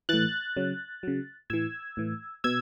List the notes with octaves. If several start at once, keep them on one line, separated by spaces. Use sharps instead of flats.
A2 E3 F#6 A6
C#3 F#3
C#3 F#3
A2 E3 E6 G#6
A2 E3
B2 E6 G#6